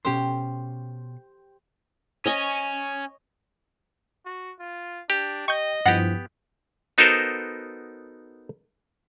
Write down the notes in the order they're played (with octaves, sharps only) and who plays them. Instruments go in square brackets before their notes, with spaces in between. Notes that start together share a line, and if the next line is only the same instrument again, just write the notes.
[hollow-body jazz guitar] B2 C#4 C6 [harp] G4 C5
[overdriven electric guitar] C#4 [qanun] C#5 D#5 G#5
[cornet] F#4
F4
[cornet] D4 [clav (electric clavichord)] G4
[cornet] D#5 [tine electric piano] G5 [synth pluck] C#6 G6
[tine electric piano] G2 F3 E4 [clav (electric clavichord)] B3 G4 [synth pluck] F#5 A#6 C7
[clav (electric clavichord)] B3 D#4 F#4 A4 A#4 C5